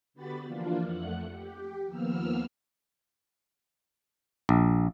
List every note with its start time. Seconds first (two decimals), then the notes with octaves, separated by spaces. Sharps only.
0.14 D3 B3 F#4 G4 B5 A6
0.45 E3 F3 A#3 D4 F4
0.83 F2 A3 F#5 F#6
1.30 G4
1.86 D#2 F3 A#3 B3 E6 F6
4.49 A#1